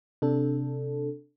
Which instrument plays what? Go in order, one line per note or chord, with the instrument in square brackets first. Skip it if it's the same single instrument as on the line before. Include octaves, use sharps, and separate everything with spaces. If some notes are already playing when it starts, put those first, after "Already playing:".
[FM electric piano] C3 D4 A4